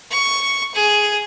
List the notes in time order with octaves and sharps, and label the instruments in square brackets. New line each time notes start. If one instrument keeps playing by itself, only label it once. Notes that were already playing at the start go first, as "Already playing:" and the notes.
[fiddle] C#6
G#4